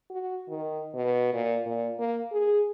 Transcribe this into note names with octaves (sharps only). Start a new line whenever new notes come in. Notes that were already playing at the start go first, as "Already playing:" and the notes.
F#4
D#3
B2
A#2
A#2
A#3
G#4